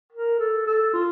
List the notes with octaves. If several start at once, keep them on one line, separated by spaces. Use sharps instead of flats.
A#4
A4
A4
F4